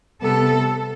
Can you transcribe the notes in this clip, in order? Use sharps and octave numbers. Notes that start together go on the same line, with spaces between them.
C3 G3 B3 A4